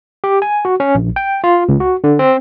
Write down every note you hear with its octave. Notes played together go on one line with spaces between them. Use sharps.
G4
G#5
F#4
C#4
A#1
G5
F4
C#2
F#4
D3
C4